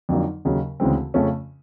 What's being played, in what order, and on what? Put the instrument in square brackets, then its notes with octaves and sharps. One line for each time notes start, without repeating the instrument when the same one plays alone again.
[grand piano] F2 D3 F#3 A#3 D#4
D#2 C#3 F#3
D2 C#3 E3 G#3 C4
F2 C#3 F3 A3 C#4